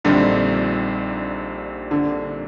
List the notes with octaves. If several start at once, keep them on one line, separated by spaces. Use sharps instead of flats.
A#1 A#2 D3 G3 C4 D#4
D3